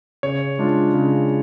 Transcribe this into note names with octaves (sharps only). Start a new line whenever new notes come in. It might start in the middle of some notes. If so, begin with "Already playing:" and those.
C#3 C#5
G#3 D4 F4
C#3